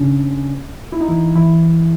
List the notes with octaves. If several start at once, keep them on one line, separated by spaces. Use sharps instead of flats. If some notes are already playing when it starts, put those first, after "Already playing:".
Already playing: C#3 C#4 D4
E4
D#4
E3 E4
E3 E4